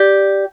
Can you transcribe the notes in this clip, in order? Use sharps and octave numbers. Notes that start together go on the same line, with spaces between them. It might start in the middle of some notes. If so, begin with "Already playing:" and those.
Already playing: G4 D5